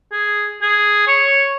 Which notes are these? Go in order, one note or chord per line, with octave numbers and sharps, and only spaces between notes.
G#4
G#4
C#5